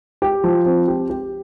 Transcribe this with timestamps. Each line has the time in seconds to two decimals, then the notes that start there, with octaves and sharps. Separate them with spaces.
0.22 G4
0.44 F3
0.66 C4
0.88 G4
1.10 G4